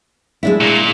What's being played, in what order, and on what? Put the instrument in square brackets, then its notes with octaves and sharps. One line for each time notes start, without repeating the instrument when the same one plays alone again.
[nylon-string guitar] G#3 D4 E4
[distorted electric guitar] A#2